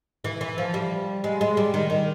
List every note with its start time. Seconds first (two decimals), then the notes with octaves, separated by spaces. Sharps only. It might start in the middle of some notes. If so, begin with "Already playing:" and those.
0.24 E3
0.41 E3
0.58 F3
0.74 G3
1.24 G#3
1.41 G#3
1.57 G3
1.74 D#3
1.90 D#3